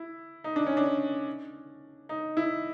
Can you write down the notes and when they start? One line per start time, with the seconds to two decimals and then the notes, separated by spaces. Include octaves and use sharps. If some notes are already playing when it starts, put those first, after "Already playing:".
Already playing: E4
0.44 D#4
0.56 D4
0.67 C#4
0.77 D4
2.09 D#4
2.37 E4